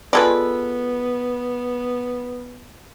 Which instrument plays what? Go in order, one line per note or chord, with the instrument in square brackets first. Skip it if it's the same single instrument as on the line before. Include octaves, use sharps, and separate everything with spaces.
[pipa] G#3 A4 B4 [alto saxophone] B3 [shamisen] F4 G#4 D5